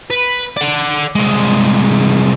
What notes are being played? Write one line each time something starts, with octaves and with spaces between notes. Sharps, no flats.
B4
D5 F#5
C2 G#3